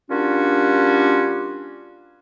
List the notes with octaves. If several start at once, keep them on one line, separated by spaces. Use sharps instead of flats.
G3 A#3 C#4 D4 F4 F#4